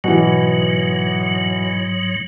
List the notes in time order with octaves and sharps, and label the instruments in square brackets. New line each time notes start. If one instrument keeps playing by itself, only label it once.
[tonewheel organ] G#2 F#3 [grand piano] B2 E3